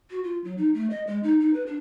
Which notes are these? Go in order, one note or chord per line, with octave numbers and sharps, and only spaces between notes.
F#4
F4
F#3
D#4
A3
D#5
G#3
D#4
D#4
B4
D4